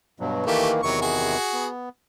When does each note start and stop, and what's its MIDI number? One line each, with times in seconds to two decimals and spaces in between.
0.20 0.45 43
0.20 0.45 47
0.20 0.45 54
0.46 0.82 51
0.46 0.82 52
0.46 0.70 57
0.46 0.82 58
0.46 0.70 67
0.83 1.37 40
0.83 1.37 48
0.83 1.37 51
0.83 0.99 54
0.83 0.99 85
1.02 1.67 66
1.02 1.67 68
1.53 1.89 59